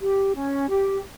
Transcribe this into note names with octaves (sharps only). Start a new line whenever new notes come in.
G4
C#4
G4